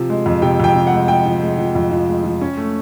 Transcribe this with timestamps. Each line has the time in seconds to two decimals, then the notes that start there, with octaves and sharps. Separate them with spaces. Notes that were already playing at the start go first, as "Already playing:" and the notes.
Already playing: C3 F3
0.10 G#3
0.26 F2
0.42 C3 G5
0.60 F2 G5
0.75 C3
0.87 F#5
0.92 G#3
1.08 G#3 G5
1.26 F3
1.42 G#3
1.58 F3
1.75 F2
1.91 F3
2.09 G#3
2.24 F3
2.41 C#4
2.57 A3